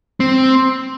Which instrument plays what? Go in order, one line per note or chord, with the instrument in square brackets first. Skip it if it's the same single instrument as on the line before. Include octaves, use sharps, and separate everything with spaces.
[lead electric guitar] C4